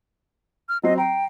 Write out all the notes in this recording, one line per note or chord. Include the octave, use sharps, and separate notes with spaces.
F6
F#3 C4 D#5 C7
G5 A#5